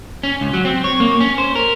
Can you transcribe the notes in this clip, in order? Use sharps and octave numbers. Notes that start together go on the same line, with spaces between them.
C#4
C#2
F#3
C4
C#5
A#3
C#4
C5
A#4